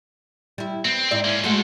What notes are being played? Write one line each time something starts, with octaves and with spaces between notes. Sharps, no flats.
G3 E4
B3 C4
G#2 E4 D5
A#3 C#4
G#3 A3 F#4 A4 C5